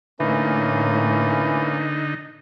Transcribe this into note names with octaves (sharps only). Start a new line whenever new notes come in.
A2 D3 E3 A#3 C#4 D#4